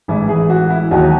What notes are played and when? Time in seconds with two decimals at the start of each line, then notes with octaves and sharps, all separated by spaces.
0.08 A1 G#2 E3 E4
0.29 G#4
0.50 F#4
0.70 E4
0.91 D#2 D#3 F#3 F#4